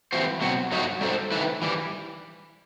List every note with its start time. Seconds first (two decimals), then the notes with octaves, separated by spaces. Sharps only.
0.12 E3 G3 C4 F#4 C5
0.41 B2 F#3 C4 F#4
0.72 G2 F#3 A3 D#4 F#4
1.01 G3 D#4 A4 C5
1.32 D#3 A3 E4 B4
1.62 E3 G3